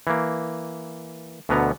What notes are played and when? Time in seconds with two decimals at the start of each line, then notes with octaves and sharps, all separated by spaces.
0.07 E3 A#3
1.49 D2 B2 D3 B3 A#5